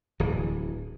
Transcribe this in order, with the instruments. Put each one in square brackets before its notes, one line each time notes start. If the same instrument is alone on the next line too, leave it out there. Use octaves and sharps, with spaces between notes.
[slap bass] D1 E3